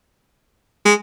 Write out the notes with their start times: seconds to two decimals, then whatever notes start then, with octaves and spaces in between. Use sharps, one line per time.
0.86 G#3